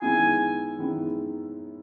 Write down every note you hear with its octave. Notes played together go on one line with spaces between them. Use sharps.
F#2 D#3 G#3 B3 E4 G#5
F#2 D#3 G#3 B3 E4